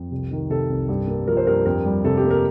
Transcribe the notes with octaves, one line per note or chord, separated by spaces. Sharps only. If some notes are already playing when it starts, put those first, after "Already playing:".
Already playing: F2
C2
D#3
C3 A4
C2
G2
A#3
F3 A#4
C5
G2 A#4
F2 A#4
G3
C3 A4
G4
A#3
A#4